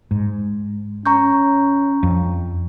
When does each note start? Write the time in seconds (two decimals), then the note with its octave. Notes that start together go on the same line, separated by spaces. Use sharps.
0.11 G#2
1.06 C#4 A#5 C#6 G6
2.03 F2